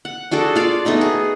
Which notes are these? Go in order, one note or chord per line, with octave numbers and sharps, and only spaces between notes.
F#5
D4 F#4 G#4 A4
F4 D5 F5
A3 B3 D#4 F#4
G#4